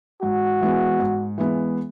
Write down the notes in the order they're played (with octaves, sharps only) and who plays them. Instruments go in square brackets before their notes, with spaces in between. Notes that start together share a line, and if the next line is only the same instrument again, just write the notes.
[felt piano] G#2 [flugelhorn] F#4
[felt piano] E3 G#3 B3
G#2
E3 G#3 B3